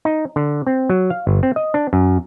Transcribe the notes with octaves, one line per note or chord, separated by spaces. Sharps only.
D#4
D3
C4
F#3
F5
G1
C4
D#5
D4
F#2